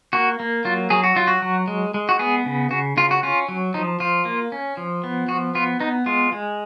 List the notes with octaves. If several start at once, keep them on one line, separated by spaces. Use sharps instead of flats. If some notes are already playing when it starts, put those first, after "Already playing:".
A#3 F#4
A#3
F#3 F4
F#3 G#4
F#4
F#3 F4
F#4
F#3
G#3
G#3
F#4
B3 G#4
C#3
C#3 F#4
C#3 F4
F#4
C#4 F4
F#3
F3 D#4
F3 F4
A#3
C#4
F3
B3
F3 F#4
B3 F4
B3 D#4
G#3 F4
G#3